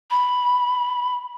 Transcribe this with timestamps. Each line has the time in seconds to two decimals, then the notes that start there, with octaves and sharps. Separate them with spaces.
0.11 B5